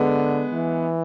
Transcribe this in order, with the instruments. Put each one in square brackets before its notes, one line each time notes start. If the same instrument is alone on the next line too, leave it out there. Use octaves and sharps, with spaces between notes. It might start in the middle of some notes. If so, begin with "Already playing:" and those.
Already playing: [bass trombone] D3 [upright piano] G#3 B3
[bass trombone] E3